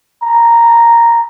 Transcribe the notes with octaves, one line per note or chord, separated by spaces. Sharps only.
A#5